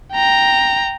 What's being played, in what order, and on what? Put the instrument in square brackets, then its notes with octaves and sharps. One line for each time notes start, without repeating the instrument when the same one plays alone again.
[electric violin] G5 A#5